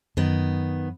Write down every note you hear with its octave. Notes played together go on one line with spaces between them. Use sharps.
F#2 D#3 B3